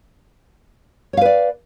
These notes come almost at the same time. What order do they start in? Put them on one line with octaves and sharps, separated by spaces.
C#5 F5 B4 D5